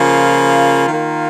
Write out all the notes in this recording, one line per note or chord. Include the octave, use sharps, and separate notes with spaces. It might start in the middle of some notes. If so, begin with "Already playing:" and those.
Already playing: C#3 F3 A#3 F4
D#3 A#3 F4